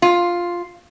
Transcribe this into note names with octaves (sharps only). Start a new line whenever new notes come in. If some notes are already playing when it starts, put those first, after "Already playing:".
F4